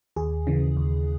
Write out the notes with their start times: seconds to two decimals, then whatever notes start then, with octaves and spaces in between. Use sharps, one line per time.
0.16 D#2 G#4
0.47 C#3 E3
0.77 D#2